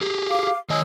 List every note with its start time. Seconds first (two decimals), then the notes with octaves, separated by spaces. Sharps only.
0.01 G4 G#4
0.29 F5 D6
0.70 D#3 C#5 D#5 G#5 D#6 E6